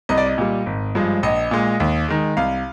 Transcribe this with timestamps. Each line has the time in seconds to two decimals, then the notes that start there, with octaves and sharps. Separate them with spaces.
0.09 C2 D#5
0.18 D5
0.26 D#5
0.38 A#2 G3
0.66 G#1
0.95 G2 F3 G#3
1.23 A#1 D#5
1.51 A#2 G#3
1.80 D#2
2.08 D#3 G#3
2.37 C2 F5